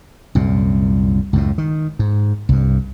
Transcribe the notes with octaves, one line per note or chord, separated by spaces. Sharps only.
C2 F#2 A#2
C#2 F#2 A2
D#3
G#2
C2 G2